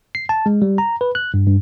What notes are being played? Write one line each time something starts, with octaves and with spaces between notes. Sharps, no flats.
C7
A5
G#3
G3
A#5
B4
F#6
G2
G2